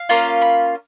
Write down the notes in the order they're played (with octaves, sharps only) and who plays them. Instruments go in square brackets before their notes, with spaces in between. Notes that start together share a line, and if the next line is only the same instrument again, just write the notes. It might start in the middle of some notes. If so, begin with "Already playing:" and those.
Already playing: [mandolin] F5
A#3 C#4 F4
B5